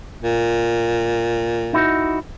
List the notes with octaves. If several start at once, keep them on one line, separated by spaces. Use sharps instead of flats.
A#2
D#4 E4 F#4